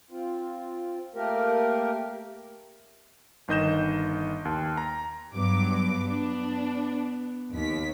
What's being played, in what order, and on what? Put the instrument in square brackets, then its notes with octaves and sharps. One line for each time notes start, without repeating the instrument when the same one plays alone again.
[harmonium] C4 F4
A3 A#3 G4 A#4
[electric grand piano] G1 D#3 D#5 G6 E7
D#2
A#5
[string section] G2 F#3 D6 [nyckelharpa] B3
[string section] D4
D#2 B6